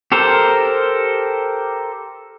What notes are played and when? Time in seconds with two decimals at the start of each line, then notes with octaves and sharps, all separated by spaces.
0.12 G4 A4 A#4 C5